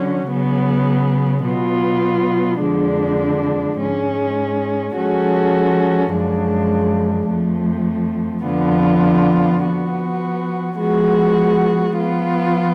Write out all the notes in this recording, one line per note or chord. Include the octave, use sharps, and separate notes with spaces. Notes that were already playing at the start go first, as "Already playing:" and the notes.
Already playing: D3 F#3 C#4 F#4
C#3 F#3 B3
B2 F#3 B3 F4
F2 D3 F3 G#3 D4
G#2 G#3 C#4
F3 G#3 C#4 F#4 A4
F#2 C#3 F3 G#3 D4
F2 F3 A3
F2 D3 F3 B3 F4
F3 B3 F#4
F3 G#3 B3 F#4
F3 B3 F4